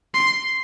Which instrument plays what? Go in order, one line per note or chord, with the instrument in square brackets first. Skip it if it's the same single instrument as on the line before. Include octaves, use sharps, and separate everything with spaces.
[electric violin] C6